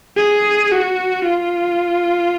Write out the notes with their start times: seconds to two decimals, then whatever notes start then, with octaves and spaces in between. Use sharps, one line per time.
0.17 G#4
0.71 F#4
1.24 F4